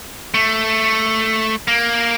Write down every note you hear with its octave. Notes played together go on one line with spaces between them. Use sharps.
A3
A#3